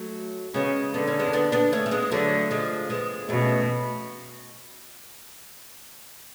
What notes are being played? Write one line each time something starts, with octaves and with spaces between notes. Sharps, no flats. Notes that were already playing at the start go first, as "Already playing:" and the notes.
Already playing: F#3 A3
C#3 G#3 B3
D3 B3
C#4
G#3 B3
B3 D4
B3 D4
A3 C#4
A3
G#3 B3
D3 F#3 A3
F3 G#3
G#3 B3
B2 A3 C#4